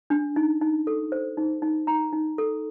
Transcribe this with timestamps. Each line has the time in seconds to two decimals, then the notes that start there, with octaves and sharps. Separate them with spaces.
0.10 D4
0.36 D#4
0.61 D#4
0.87 A4
1.12 C5
1.37 D#4
1.62 D#4
1.87 D#4 A#5
2.13 D#4
2.38 A4